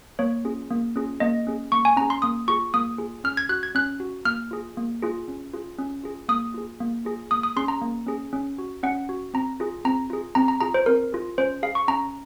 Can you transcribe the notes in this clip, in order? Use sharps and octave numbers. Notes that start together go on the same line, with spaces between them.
A#3 C#5
C#4 F4 G#4
A#3
C#4 F4 G#4
A#3 D#5
C#4 G#4
A#3 C#6
G#5
C#4 G#4 A#5
C6
A#3 D#6
F4 G#4 C#6
A#3 D#6
F4 G#4
C#4 F6
G#6
F#4 F#6
G#6
C#4 F#6
F#4
A#3 F6
F4 G#4
A#3
F4 G#4
C#4
F4 G#4
C#4
F4 G#4
A#3 D#6
F4 G#4
A#3
F4 G#4
A#3 D#6
D#6
C#4 G#4 C6
A#5
A#3
C#4 G#4
C#4
F#4
C#4 F#5
F#4
C4 A#5
F4 G#4
C4 A#5
F4 G#4
C4 A#5
A#5
F4 G#4 A#5
C5
C4 A#4
F4 G#4
C#4 C5
G#4 F5
C#6
C#4 A#5